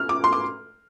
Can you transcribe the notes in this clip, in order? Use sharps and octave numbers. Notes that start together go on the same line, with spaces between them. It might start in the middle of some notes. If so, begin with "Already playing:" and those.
Already playing: F6
D6
C6
D6